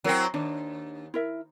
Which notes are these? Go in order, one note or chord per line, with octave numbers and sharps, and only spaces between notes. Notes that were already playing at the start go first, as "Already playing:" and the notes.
F#3 C4 E4 A#4
D#2 D4
E4 A#4 E5